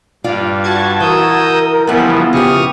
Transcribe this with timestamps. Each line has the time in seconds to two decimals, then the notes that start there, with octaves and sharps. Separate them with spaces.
0.24 G2 F4 D5 F5
0.64 F#4 A5 G#6
1.00 E3 A#4 D#6 E6 G6
1.87 C#3 E3 F3 G3 B3 E4 F4 F#5
2.33 F2 C#3 G4 C#6 D#6 F6